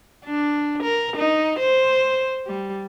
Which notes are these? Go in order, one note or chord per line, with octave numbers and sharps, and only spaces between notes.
D4
A#4
D#4
C5
G3